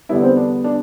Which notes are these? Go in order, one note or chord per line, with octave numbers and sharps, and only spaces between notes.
E2 D3 G3 B3 E4
C4
D4
D4